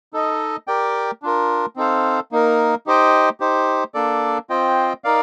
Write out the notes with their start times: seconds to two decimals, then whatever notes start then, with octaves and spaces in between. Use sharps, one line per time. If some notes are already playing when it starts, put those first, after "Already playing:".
0.13 D#4 A4 D#5
0.67 G4 A#4 D5 G5
1.22 D4 F4 A#4
1.76 C4 D#4 A4 C5 F5
2.32 A#3 D#4 A#4
2.86 D#4 G4 C5 D#5 G5
3.40 D#4 G4 C5
3.94 A#3 D4 A4 D5
4.50 C4 F4 C5 D#5 G5
5.04 D#4 A#4 D5 F5